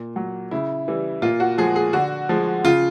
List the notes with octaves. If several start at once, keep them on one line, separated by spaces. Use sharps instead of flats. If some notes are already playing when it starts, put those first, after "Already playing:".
Already playing: A#2
F#3
C#3 E4
E3 G3
A#2 F4
F#4
F3 G#3 G#4
G#4
D3 F#4
F3 G#3
C#3 F4